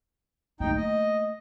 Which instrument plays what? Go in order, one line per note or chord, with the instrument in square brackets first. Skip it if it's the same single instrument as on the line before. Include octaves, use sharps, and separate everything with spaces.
[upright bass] A3 A#3 [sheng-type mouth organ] D#4 G5
[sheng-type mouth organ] D#5